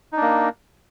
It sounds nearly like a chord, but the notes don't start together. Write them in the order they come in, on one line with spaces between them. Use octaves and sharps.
D#4 D4 A#3